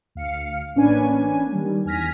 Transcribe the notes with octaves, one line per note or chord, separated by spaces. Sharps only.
D2 F5 C#7
A1 A#3 C#4 D4 B4 G#5
D#3 G3
E2 G#5 F6 A#6 B6